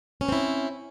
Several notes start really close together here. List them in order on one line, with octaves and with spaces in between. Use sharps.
C#4 B4 C4 E4